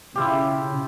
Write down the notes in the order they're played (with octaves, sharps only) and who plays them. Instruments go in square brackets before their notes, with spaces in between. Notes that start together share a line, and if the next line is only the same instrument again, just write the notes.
[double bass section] C#3 [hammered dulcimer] E4 F4 G4